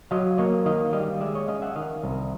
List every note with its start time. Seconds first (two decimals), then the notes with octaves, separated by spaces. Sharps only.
0.11 F#3 D#5 F5
0.38 A#3 C#5 D#5
0.66 D#3 D#5 F5
0.93 G3 D#5 F5
1.21 G#3 D5 E5
1.35 C#5 D#5
1.48 C#4 D#5 F5
1.62 E5 F#5
1.76 D#3 D#5 F5
2.04 C2